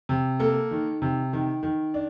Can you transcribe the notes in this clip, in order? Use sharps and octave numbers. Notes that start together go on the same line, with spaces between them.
C3
A#3 A4
D#3
C3
D#3
D#3
D4